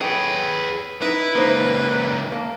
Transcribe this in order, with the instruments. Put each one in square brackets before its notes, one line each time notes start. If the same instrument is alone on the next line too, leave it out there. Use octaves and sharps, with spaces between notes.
[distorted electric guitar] G#4 B4 [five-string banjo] A4 C#5 G5
[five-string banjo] D#4 [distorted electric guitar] E4 [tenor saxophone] B4
[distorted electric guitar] C#2 A#3 [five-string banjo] D#4 C5
[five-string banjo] A#3 A5